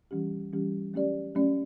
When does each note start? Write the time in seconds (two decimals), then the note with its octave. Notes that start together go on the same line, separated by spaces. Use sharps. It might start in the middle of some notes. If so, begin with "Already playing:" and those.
0.11 E3 G3 C#4 G4
0.53 E3 G3 C#4 G4
0.94 F#3 A3 C#4 G4 D5
1.35 F#3 A3 C#4 G4 D5